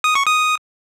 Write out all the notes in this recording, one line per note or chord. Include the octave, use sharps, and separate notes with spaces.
D#6
C#6
D#6